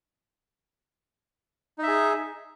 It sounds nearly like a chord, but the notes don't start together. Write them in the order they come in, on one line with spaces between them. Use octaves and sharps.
D#4 E5 G#4